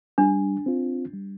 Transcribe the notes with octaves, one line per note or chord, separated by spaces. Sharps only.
G3 D4
C4 F4
G3